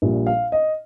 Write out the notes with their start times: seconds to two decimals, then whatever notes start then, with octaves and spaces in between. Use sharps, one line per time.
0.02 A#1 A#2 G3
0.27 F5
0.52 D#5